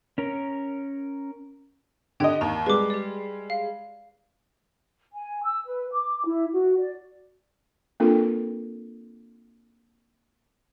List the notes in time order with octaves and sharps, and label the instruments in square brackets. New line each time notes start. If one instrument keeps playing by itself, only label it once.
[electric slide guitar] C#4 A#4
[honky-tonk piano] D3 D#5 [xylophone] G4 G5 G#6
[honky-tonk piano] D#2 [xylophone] A#5
[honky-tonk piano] G3 G#3 [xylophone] B4 D6
[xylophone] G4 D5
F5
[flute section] G#5
E6
B4
D6
E4
F#4
D5
[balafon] A#3 C4 D4 F4 A4 A#4